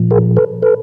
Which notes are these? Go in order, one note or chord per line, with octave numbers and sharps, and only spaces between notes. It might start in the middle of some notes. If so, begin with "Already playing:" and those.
Already playing: A#2 F3
G#4 A#4
A4 B4
A4 B4